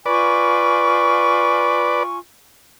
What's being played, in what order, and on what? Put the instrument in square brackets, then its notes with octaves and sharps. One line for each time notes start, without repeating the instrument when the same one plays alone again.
[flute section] F4 G#5 C#6 [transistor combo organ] B4 D5